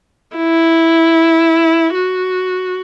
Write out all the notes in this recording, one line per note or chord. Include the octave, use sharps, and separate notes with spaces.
E4
F#4